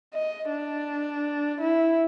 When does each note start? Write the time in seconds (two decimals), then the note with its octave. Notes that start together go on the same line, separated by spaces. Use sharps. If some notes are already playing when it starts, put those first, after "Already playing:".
0.15 D#5
0.50 D4
1.61 E4